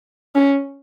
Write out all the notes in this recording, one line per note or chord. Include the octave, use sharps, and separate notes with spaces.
C#4